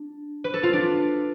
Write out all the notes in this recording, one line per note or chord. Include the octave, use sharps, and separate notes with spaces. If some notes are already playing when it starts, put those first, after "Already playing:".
Already playing: D4
B4
A4
F4
D4